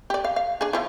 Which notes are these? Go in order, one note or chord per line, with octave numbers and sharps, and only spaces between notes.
G4 D5
F5
F5
D4 G#4
F3 E4